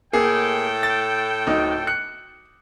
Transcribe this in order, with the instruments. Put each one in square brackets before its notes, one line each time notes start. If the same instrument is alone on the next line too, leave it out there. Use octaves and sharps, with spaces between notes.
[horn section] A2 A4 G5 [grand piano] A#3 G#4
[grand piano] A6
D1 D#4
F#6 C#7